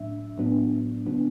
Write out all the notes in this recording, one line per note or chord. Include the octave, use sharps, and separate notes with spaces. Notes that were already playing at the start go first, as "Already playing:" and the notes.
Already playing: A2 F#3 A3 D4 E5
A2 F#3 B3 D4
C#3 F#3 B3 D4